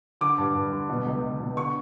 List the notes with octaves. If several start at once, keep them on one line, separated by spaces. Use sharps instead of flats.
D3 D6
G2
G2
D3
B2
C#2
C#2
B2
D3 C#6